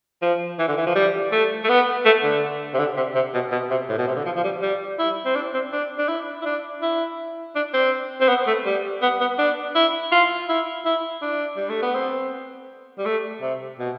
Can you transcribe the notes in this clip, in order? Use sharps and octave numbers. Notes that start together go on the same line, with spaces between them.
F3
E3
D3
E3
F3
G3
A3
A3
B3
A3
D3
C3
D3
C3
C3
B2
B2
C3
A2
B2
C3
D3
F3
F3
G3
G3
E4
C4
D4
C4
D4
D4
E4
E4
D4
E4
D4
C4
C4
B3
A3
G3
B3
B3
D4
E4
F4
E4
E4
D4
G3
A3
B3
C4
G3
A3
C3
B2